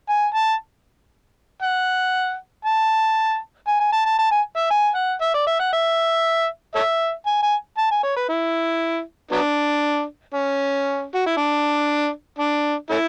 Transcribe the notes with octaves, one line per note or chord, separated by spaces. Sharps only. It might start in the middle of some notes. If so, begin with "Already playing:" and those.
G#5
A5
F#5
A5
G#5
G#5
A5
A5
A5
G#5
E5
G#5
F#5
E5
D5
E5
F#5
E5
A4 C#5 E5
G#5
G#5
A5
G#5
C#5
B4
E4
F#3 B3 D4
C#4
F#4
E4
D4
D4
A3 C#4 E4